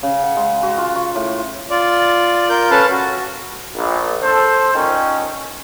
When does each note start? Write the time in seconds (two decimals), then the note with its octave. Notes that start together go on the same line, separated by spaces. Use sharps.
0.03 C#3
0.23 F#5
0.36 G#3
0.63 F#4
0.78 F4
0.95 C#6
1.15 A2
1.70 F4 D5
2.49 F4 A#4 G6
2.71 C#4 A4 B4 F5 A5
2.90 F#4
3.76 A#1
4.22 A4 C5
4.75 A#2 D#3 C#4